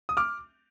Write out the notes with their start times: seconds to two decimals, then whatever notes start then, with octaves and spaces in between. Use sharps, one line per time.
0.09 D#6
0.17 D6 F6